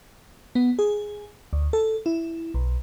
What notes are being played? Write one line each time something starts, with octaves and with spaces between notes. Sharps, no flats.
B3
G#4
D2
A4
E4
B1